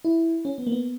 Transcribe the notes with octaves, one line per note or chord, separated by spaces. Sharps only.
E4
C#4
B3
A#3
B3